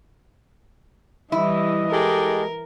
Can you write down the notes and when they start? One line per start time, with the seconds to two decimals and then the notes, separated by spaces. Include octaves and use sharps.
1.32 E3 G3 E4 D#5
1.92 G#3 G4 A4 A#4